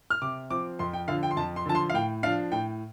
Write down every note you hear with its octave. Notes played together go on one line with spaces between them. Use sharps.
F6
C3 D6
F3 C4 D6
F2 C6
G5
D3 F3 F5
G5
C6
F2 A5
C6
D3 F3 A5
C6
F5
A2 G5
F3 D4 F5
A2 G5